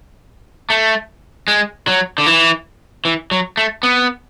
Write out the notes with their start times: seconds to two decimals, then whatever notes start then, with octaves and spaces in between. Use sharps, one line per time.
0.70 A3
1.48 G#3
1.88 F#3
2.18 D3
2.26 E3
3.05 E3
3.31 F#3
3.57 A3
3.83 B3